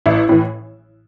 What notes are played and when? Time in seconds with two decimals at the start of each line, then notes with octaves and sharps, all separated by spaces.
0.06 A1 E4
0.29 A2 E3